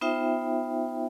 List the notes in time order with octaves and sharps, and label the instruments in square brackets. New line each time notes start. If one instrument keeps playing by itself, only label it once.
[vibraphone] B3 D#4 F4 C5 E5 G5